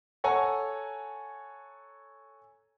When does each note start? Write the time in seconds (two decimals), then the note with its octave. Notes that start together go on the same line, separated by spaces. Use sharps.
0.24 A4 C#5 F#5 G#5 A#5